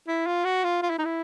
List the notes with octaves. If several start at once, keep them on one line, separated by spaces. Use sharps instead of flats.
E4
F4
F#4
F4
F4
E4
D#4
E4